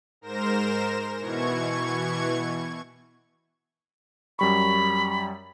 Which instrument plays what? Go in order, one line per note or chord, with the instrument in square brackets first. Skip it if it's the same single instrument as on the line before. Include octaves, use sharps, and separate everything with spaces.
[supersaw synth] G#2 A#4 C5 A#6 E7
B2 E3 C#6 G#6
[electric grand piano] F#2 G3 C#6 [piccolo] B5